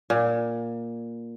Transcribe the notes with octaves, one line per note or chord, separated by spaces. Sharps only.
A#2